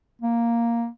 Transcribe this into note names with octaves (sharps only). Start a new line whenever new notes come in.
A#3